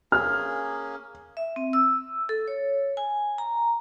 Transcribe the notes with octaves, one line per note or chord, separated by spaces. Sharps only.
A#3 C#4 G#4 F6
E5
C4
E6
A4
C#5
G#5
A#5